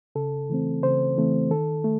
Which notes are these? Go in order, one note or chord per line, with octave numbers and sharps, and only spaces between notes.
C#3 A4
E3 A3 C4
C#3 C5
E3 A3 C4
D#3 A4
A3